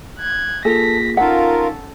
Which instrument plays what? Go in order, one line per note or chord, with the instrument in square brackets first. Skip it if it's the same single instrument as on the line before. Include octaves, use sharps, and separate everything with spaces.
[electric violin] F#6 G#6
[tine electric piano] A#3 F4 G#4 [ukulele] A4 [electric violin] A#6 B6
[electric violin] C#4 A4 [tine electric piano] D#4 B6 [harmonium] F4 A#4 [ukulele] F#5